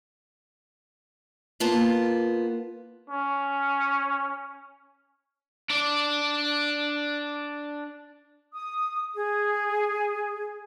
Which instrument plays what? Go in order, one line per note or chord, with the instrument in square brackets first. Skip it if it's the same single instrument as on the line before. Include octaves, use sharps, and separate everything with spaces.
[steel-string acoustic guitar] A#3 B3 F4 A5
[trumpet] C#4
[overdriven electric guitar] D4 D5
[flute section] D#6
G#4